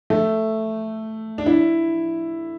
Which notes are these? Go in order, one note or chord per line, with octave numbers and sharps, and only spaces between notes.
A3
D4
E4